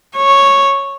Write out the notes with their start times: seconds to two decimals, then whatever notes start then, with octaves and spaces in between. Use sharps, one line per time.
0.16 C#5